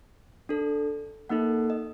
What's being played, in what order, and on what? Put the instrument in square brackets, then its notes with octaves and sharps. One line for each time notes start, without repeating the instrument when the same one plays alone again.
[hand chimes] D4 A4
A#3 D#4 A4 F#5
D#5